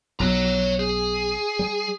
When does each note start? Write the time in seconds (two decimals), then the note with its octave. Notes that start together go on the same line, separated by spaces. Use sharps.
0.20 B1 C#5 A#5
0.80 G#4
1.59 G3